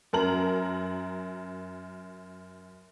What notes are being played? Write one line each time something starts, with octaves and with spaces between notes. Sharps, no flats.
F#2 A#4 A#5 F#7